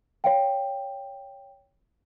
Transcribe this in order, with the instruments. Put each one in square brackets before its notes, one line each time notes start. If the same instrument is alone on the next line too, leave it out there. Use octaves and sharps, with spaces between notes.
[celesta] C#5 F5 G5